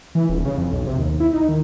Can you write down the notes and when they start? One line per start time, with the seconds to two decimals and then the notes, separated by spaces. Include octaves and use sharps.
0.15 E3
0.29 D#1
0.45 C#3
0.58 F2
0.72 B1
0.87 C3
0.99 D#2
1.20 E4
1.33 D#4
1.49 D#3